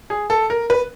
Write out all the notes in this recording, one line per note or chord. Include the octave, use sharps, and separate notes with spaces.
G#4
A4
A#4
B4